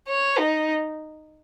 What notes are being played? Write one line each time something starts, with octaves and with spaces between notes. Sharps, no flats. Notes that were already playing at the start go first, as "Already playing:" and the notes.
C#5
D#4